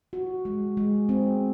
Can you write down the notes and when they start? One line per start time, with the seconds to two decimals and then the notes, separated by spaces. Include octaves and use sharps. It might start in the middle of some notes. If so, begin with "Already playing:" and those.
0.13 F#4
0.45 G#3
0.77 G#3
1.09 C4